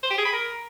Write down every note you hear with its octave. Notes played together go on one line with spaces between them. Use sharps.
C5
G4
G#4
B5
A#4